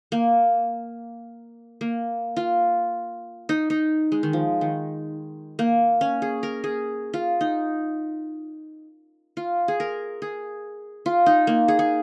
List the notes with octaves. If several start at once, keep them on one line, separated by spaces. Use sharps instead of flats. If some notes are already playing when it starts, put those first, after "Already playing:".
A#3
A#3
F4
D#4
D#4
G#3
D#3
F3
D#3
A#3
C#4
G#4
A#4
G#4
F4
D#4
F4
G#4
A#4
G#4
F4
D#4
A#3
G#4
G#4